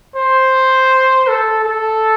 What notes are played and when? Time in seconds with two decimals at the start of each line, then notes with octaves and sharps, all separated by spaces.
0.16 C5
1.28 A4
1.65 A4